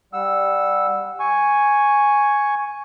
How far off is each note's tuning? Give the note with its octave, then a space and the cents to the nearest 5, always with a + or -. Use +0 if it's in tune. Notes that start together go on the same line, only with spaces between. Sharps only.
G3 +0 F#5 -20 E6 +0
G#5 +0 C#6 +0